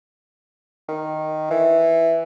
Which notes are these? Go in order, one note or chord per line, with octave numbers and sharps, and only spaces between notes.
D#3
E3